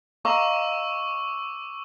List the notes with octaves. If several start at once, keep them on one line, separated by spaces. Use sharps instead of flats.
D#5 F5 A#5 C#6 D6 E6